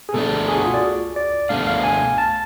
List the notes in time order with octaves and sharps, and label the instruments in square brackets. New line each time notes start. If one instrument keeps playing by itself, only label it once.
[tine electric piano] G#4
[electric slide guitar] B2 A3 D4 [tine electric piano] A4
[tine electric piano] G#4
F#4
F4
D5
D5
[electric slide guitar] B2 A3 D4 [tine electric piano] F5
[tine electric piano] F5
G#5
A5